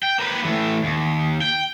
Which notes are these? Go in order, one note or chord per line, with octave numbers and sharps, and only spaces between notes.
G5
A#3 B4
E3 A3
D#2
G5